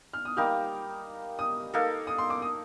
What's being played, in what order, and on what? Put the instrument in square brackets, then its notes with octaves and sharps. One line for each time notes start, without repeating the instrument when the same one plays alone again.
[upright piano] F6
D#6
[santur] G3 A#3 D#4 G4 [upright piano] F6
[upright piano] D#6
[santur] A#3 D#4 A4
[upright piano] D#6
C6
D6
D#6